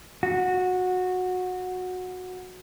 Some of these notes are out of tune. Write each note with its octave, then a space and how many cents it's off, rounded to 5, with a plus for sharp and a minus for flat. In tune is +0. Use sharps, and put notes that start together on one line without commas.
F#4 -15